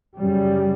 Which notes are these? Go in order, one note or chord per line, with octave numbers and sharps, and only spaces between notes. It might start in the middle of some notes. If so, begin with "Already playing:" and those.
F#2 C#3 G3